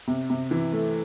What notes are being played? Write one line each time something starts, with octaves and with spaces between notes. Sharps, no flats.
C3
C3
E3
A3